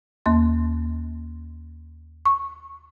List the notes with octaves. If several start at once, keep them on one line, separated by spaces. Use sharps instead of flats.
D#2 A#3 C6
C#6